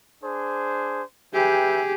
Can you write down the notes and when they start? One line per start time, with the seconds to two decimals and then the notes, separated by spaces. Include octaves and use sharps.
0.23 D4 G#4 C5
1.33 G4 G#4 B4 E5 G5